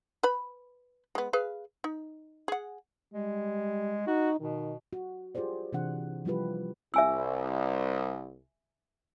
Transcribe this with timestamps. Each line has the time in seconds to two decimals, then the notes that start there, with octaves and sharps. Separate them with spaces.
0.23 B4 B5
1.15 G#3 B3
1.33 G#4 B4 F5
1.84 D#4
2.48 G#4 F#5
3.14 G3 G#3
4.07 D#4 F#4
4.40 B2 D#3
4.93 F#4
5.35 F4 G4 G#4 C5 D5
5.73 C3 E3 C4 D4 F#5
6.25 F3 G3 E4 F4 G4 B4
6.94 C2 E5 G#5 E6